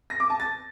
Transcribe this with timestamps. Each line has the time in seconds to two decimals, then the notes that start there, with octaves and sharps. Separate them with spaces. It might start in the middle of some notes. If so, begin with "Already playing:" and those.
0.10 A#6
0.20 D6
0.30 A5
0.40 A6